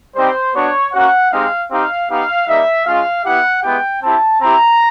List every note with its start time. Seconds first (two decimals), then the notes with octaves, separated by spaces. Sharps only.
0.15 G3 C4 D#4 G4 C5
0.54 B3 D4 F#4 C#5
0.93 A#3 C#4 F#4 F#5
1.31 G#3 C4 D#4 G4 F5
1.70 C4 D#4 G4 F5
2.09 B3 D#4 G4 F5
2.47 G3 A#3 D#4 E5
2.86 G#3 C#4 F4 F5
3.25 B3 E4 G4 F#5
3.63 G#3 B3 E4 G4 G5
4.02 C4 E4 G4 A5
4.41 C4 E4 G4 A#5